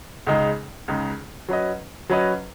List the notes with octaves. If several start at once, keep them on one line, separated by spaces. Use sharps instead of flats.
C#2 C#3 G#3 D#4
C#2 C#3 G#3 D#4
F#3 C#4 B4 D#5
F#3 C#4 B4 D#5